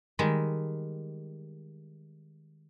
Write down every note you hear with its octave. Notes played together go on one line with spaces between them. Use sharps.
D#3 G3 G#3